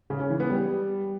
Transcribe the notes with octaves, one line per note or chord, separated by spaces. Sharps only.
C#3
C#4
E3
B3
G3